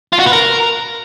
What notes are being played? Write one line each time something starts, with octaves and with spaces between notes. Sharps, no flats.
F4
F#4
B4
A#4